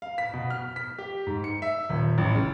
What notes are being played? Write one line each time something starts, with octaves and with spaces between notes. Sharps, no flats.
F5
B6
B2
F6
B6
G4
G#2
C#7
E5
D#1
A1
C#3